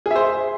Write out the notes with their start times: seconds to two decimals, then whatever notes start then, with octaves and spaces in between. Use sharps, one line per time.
0.06 G#4
0.11 E5
0.16 C5